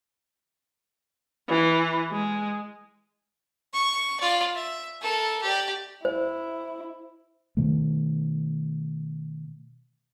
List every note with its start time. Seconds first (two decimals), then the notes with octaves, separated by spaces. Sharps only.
1.49 E3
2.11 G#3
3.74 C#6
4.20 F4 D5
4.55 E5
5.02 A4 A#4
5.42 G4 D5
6.05 E4 C5
7.57 B2 D#3 A3